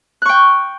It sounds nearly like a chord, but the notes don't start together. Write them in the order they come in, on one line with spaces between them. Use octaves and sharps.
F#6 C#6 G5